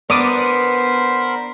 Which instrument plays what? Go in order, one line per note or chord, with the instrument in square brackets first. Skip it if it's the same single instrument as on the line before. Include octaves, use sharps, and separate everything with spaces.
[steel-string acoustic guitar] B3 D4 [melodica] A#4 C5 B5 [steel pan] D5 D6 D#6